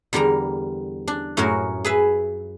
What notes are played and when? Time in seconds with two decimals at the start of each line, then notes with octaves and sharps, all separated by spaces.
0.13 E2 D3 G3 A#4 A#5
1.08 D4
1.37 F#2 A2 C#4 F#4 A#4
1.85 G#4 B4 E5